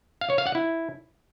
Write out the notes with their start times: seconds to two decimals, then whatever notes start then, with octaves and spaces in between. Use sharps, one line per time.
0.21 F5
0.30 C#5
0.38 F5
0.47 F#5
0.55 E4